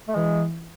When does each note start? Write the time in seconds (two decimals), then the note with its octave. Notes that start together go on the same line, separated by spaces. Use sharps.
0.08 A3
0.15 E3 G#3